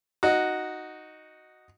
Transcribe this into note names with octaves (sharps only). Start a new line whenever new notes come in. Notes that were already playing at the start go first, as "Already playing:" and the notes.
D#4 F#4